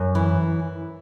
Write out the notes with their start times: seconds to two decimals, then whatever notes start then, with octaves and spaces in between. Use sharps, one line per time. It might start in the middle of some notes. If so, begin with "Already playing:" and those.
Already playing: F#2
0.15 E3